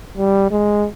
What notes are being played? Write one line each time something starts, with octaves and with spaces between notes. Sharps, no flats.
G3
G#3